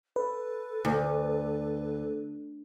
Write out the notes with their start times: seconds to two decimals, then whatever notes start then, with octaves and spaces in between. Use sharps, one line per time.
0.16 A4 B4
0.85 D2